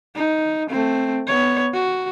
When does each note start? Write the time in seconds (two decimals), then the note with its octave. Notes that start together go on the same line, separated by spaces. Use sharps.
0.16 D#4
0.69 A3 C4
1.27 B3 C#5
1.74 F#4